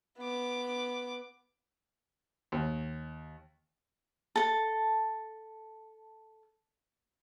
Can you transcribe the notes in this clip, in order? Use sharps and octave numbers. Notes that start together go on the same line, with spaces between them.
B3 D6
D#2
A4 A5